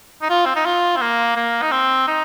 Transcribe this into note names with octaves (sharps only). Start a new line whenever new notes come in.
D#4
F4
C4
D#4
F4
C4
A#3
A#3
D#4
C4
D#4